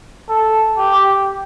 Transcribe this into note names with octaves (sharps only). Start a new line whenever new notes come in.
A4
G4